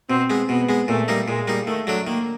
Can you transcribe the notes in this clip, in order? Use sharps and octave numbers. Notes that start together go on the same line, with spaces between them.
B2 C4
G#3 B3
B2 B3
G#3 B3
A#2 A3
G3 A#3 D#4
A#2 G#3
G3 A#3 D#4
D#3 A3
F#3 A3 D4
D#3 A#3